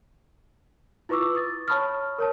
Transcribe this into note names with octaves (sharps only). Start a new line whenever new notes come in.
E4 F4 B4 C#6 D6 E6
D#6 A6
C#5 A5 B5 C#6 D#6 F6
A#4 C#5 A5